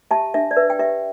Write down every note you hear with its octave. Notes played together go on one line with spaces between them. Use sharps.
G4 E5 A5
D4 E5
D5
B4 E5
G5
G4 E5